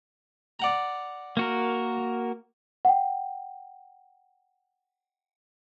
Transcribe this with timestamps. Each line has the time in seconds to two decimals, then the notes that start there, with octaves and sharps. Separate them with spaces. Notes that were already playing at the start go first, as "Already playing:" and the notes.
0.60 D5 F#5 A#5
1.37 A#3 F#4 A#4
2.85 F#5 G5